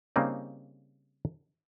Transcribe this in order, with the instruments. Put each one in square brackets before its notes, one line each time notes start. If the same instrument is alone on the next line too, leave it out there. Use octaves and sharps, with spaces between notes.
[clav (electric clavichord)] C#3 G3 A#3 C4 D#4